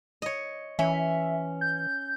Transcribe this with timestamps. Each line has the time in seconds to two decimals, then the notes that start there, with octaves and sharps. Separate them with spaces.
0.22 C#5 D#5
0.79 E3 C#4 E5
1.61 G6